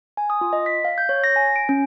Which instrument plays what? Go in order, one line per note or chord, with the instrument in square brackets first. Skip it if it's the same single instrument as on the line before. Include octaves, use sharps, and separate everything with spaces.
[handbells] G#5
D#6
F4
D#5
B6
F5
G6
C#5
A#6
G#5
D7
C#4